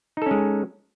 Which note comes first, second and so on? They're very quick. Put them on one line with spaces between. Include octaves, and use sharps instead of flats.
D#4 A4 C#4 G#3